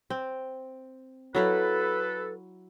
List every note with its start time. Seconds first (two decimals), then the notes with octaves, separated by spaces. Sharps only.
0.10 C4
1.35 F#3 E4 A4 B4 F5